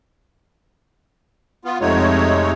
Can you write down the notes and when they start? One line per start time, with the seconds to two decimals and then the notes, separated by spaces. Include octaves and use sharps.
1.65 B3 F4
1.81 F2 C3 G#3 A3 D#4 C#5